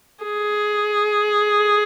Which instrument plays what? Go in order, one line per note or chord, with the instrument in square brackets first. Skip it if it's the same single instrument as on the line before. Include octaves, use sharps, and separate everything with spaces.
[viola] G#4